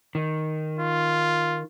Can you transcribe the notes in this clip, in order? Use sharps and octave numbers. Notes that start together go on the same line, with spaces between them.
D#3
F4